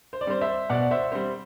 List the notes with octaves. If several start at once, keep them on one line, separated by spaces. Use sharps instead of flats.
C5
D5
G3 C4 C5
C5 E5
B2 D5 F#5
C5 E5
G3 C4 C5